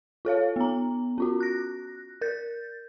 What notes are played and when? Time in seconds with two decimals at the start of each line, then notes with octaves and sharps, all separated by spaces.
0.25 F4 A4 C#5 F5
0.56 B3 A#5
1.18 C#4 F4 F#4
1.40 F#6 A#6
2.21 A#4 G6 A6